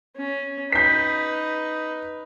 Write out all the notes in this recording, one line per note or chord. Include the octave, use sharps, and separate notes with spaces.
C#4
D#4 B4 G6 B6